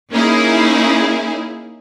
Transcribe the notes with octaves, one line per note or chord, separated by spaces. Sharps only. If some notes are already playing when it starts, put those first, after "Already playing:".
A#3 C#4 D#4 E4 G#4